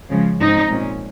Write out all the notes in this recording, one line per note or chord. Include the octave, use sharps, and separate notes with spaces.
C#3 F3 G#3
G#2 F3 C4 D#4
A#2 G#3 C#4